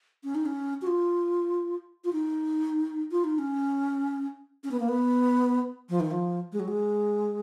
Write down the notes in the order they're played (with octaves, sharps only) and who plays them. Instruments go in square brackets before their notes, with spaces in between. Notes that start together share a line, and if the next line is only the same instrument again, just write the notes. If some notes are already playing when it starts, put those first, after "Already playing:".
[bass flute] C#4
D#4
C#4
F#4
F4
F4
D#4
F4
D#4
C#4
C#4
B3
A#3
B3
F3
D#3
F3
G#3
F#3
G#3